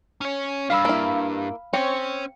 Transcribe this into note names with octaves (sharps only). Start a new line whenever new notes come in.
C#4 C#5
G2 F5 B5 E6
A#3 E4
C4 C#4 C#5 C#7